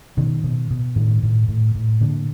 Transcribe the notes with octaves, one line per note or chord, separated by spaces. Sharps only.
B2 D#3
B2
B2
A2 D#3
A2
A2
A2
A#2 D3